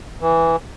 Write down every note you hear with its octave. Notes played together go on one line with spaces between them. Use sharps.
E3